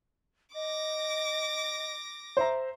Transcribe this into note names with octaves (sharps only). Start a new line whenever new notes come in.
D#5 D6 A#6
C5 E5 A#5